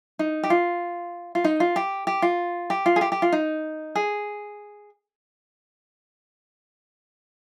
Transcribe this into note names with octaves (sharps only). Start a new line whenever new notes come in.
D#4
G4
F4
F4
D#4
F4
G4
G4
F4
G4
F4
G#4
G4
G4
F4
D#4
G#4